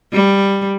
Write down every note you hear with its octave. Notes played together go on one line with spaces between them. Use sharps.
G3